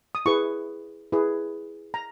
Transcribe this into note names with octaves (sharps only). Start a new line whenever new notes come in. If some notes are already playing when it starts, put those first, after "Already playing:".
D#6
E4 G#4 B4 C#6
E4 G#4 B4
A#5